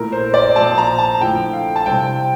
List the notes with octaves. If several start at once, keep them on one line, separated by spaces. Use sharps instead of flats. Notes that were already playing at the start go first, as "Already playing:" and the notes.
Already playing: A#2 A3 E4 A#4
C5
D5
A#2 F3 C4 F4 A5
A#5
A5
D3 F3 A3 E4 G5
F5
A5
C3 G3 C4 E4 G5